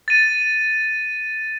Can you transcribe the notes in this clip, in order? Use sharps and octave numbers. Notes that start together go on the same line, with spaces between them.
A6 D#7